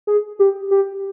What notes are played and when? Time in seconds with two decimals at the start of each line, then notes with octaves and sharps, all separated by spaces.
0.07 G#4
0.39 G4
0.71 G4